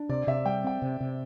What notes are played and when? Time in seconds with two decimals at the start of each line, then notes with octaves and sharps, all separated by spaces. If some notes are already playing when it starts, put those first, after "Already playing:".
Already playing: D4
0.09 C3 D5
0.27 C3 E5
0.45 G3 G5
0.64 C4 G5
0.82 C3
1.00 C3